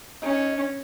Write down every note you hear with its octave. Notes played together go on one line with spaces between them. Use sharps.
C#4 D#4 G#4 D#5